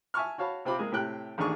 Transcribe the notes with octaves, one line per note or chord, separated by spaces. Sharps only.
E5 G#5 A5 C#6 F6
F#4 C#5 F5 A5 B5
C3 C4 F4 B5 D6
G#3 A#3 G#4
A2 C3 G5 F#6
A1 D#2 D4 G#4 C#6